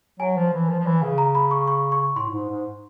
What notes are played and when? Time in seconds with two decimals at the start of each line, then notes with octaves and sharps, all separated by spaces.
0.20 F#3 G#5
0.37 F3
0.53 E3
0.69 F3
0.80 F3
0.86 E3
1.02 C#3
1.18 A#5
1.35 B5
1.51 C#6
1.67 C#6
1.92 C#6
2.16 A2 C6
2.28 A2
2.32 G#2
2.49 G#2